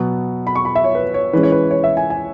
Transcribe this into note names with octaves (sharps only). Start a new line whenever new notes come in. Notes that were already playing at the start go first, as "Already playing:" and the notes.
Already playing: B2 F#3 B3
B5
C#6
B5
E5
C#5
B4
C#5
E3 G#3 C#4 B4
C#5
B4
C#5
E5
G#5
G#5